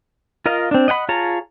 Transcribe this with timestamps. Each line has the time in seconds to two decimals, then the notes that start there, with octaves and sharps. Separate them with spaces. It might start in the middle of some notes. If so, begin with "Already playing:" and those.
0.46 F4 A#4 D#5 F5
0.71 C4 D4
0.88 D#5 F#5 G5 B5
1.09 F4 G#4 C#5 A5 A#5